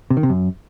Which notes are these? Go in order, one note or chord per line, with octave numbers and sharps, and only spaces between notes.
C3
D#3
C3
F#2